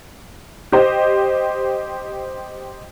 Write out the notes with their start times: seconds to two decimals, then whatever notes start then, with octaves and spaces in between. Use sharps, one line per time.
0.72 G4 C5 D#5